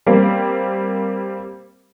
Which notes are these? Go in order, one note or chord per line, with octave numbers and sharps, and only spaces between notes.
G3 A#3 C4